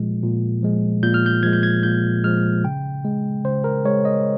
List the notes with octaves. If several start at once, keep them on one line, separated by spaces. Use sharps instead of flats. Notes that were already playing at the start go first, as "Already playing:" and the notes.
Already playing: A#2 F3 G#3
A#2
F3 G#3
A#2 G6
F6
G6
F3 G#3 G#6
G6
G#6
A#2 G6
F3 G#3 F6
C#3 G5
G#3
C#3 C5
A#4
G#3 C#5
D#5